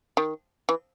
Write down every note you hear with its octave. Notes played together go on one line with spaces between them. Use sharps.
D#3
E3